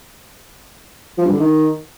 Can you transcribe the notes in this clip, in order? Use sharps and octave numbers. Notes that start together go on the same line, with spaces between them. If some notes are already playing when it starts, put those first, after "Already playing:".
F3
G2
D3
D#3